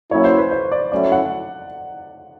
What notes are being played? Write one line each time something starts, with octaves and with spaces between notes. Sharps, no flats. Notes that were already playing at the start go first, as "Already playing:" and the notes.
F#3 A#3 C#4 E4 C#5
C5
B4
C5
D5
F#3 A3 C#4 E4 D5
F#5